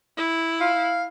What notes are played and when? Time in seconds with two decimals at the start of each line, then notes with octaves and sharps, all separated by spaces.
0.17 E4
0.61 F5